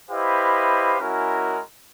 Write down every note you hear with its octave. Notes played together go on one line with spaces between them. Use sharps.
E4 G4 B4 C5 D#5 F5
G#3 C#4 E4 F#4 A#4